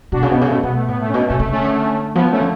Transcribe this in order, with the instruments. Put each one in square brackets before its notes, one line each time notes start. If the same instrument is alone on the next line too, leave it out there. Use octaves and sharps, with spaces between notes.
[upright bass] B2 [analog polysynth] D4 F#4
[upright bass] C#3
[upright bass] B2 [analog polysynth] B3
[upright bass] C#3
[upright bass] B2 [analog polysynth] A3
[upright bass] B2 [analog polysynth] B3
[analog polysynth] A3
[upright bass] A2 [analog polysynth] B3
[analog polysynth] A3
C#4
[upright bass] B2 [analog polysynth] B3
[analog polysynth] A3 C#4
[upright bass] B2
[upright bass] C#3 [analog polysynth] A3
[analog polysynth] A3 C#4
[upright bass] D3
[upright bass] F3 [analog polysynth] B3
[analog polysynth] A3 C#4
[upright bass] D3